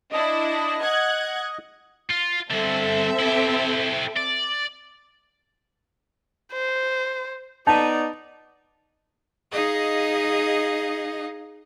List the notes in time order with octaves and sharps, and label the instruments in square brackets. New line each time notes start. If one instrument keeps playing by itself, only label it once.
[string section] D4 E4 [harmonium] D#5
[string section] F#5 F#6 G#6
[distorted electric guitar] F4
[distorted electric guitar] G2 D3 [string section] C4 A4 E5
[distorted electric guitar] E4 G4
D5
[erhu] C5
[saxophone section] B3 D#4 [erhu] D5 [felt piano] A5
[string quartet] D#4 G#4 D#5 F5